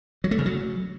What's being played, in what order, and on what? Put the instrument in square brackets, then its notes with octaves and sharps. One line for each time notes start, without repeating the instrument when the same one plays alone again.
[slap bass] F#3
A3
C#3
F#3